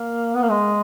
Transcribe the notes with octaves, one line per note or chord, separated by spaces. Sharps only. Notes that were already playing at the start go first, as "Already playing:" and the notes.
Already playing: A#3
B3
A#3
G#3